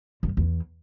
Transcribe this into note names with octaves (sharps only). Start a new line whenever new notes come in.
F#2
E2